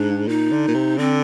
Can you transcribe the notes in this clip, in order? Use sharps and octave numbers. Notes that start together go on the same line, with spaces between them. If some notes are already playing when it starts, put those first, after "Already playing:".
Already playing: G#2 D4
A#2 D#4
D3
A#2
C3
D3 C4